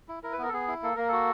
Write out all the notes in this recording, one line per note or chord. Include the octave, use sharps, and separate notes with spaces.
E4
E4 A#4
B4
B3 A#4
A4
B3 G#4
E4
A#3 A4
A#3 A#4
F#4 A4